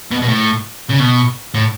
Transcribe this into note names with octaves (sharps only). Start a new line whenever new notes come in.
B2
B2
A2
C#3
B2
A2